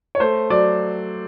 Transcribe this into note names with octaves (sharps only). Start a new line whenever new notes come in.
C#5
A3 C5
F#3 D5